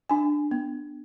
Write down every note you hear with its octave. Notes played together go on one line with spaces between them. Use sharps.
D4 G#5
B3